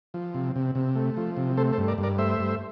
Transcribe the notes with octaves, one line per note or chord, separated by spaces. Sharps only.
F3
C3
C3
C3
A3
F3
C3
A3 A4 C5
A4 C5
G2
A#4 D5
G2
A#4 D5
A3 C5 E5
G2